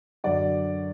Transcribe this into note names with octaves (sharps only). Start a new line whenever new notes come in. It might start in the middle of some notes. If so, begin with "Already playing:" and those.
F#2 D3 F#3 D5 F#5